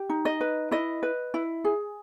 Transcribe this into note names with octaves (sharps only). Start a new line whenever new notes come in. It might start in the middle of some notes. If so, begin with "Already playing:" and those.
Already playing: G4
D#4
D#5
B4
E4 D#5
B4
E4
G#4